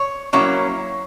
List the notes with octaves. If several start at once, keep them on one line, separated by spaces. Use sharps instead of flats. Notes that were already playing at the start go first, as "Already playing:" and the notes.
Already playing: C#5
F#3 A#3 C#4 E4 C#5